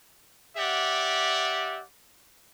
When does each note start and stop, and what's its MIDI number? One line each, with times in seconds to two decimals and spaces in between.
0.57 1.83 67
0.57 1.83 74
0.57 1.83 76
0.57 1.83 78